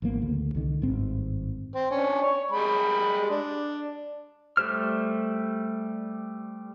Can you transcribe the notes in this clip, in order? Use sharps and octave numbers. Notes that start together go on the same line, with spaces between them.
G#1 F3 A#3 B3
D2 C#3
C2 D3 D#3
G#1 G2 C4
C4
C#4 D4
C#5
G3 G#3 B5
D4
G3 A3 G4 C5 F6